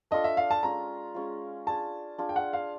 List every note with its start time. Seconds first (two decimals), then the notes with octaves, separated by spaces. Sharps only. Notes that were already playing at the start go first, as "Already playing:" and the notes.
0.11 D4 F4 A4 D#5
0.24 E5
0.37 F5
0.51 A5
0.63 G#3 C#4 F4 A#5
1.15 G#3 C#4 F4
1.67 D4 F4 G#4 A5
2.18 D4 F4 G#4
2.29 G5
2.36 F#5
2.53 F5